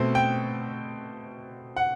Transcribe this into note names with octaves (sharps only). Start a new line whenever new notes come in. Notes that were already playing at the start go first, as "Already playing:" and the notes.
Already playing: B2 A3 C4
G5
F#5